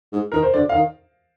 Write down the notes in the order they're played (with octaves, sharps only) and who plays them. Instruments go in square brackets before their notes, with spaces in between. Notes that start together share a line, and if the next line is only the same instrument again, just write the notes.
[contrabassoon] G#2
[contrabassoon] D#3 [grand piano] A#4
[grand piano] C5
[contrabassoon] D3 [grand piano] D5
[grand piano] F5
[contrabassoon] D#3